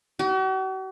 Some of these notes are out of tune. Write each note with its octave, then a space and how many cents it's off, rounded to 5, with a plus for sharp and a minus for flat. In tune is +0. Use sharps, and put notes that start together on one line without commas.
F#4 +45